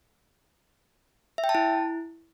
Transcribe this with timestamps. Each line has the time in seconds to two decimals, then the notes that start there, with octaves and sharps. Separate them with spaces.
1.38 E5
1.44 G5
1.49 A5
1.55 E4